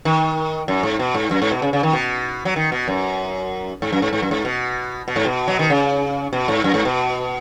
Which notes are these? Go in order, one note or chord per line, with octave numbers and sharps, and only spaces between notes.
D#3
F#2
G#2
B2
G#2
F#2
G#2
B2
C#3
C#3
D#3
B2
F#3
D#3
B2
F#2
G#2
F#2
G#2
G#2
F#2
G#2
B2
B2
G#2
B2
F#3
D#3
C#3
B2
G#2
F#2
G#2
B2